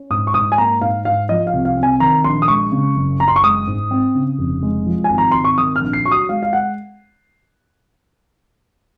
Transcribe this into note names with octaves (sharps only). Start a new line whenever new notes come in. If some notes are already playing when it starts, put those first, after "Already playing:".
Already playing: C#4
G#2 D#6
C#6
G#2 D#6
G#5
A#3 A#5
G#2 F5
G#2 F5
F3 D#5
F5
C2
F5
C4
G#5
D#3 A#5
A#1 C6
D#6
G#3 C#6
C#3
F#1
F#1 A#5
C6
C#6
G#3 D#6
G#2
C4
C#3
F1
G#3
F3
G#5
G#1
A#5
G#1 C6
C#6
D#3 D#6
F6
A#1
C7
F#3 C#6
D#6
G#3 F5
F5
F#5